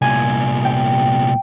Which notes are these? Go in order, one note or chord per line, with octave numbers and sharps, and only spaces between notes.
C2 A#2 G#5
G5